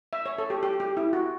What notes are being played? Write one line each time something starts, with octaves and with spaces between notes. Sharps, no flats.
E5
C#5
A4
G4
G4
G4
E4
F#4